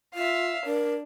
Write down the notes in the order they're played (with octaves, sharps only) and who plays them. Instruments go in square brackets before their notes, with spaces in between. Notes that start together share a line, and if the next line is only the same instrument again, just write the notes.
[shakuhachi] F4 [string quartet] E5 F5
[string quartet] D4 [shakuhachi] A#4